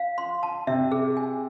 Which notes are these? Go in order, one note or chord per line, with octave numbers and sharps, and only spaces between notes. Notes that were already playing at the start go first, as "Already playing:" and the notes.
Already playing: F5
C6
A5
C3 E5
G#4
G#5